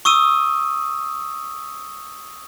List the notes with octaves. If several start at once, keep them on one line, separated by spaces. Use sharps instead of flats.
C#6 D#6 E6 D#7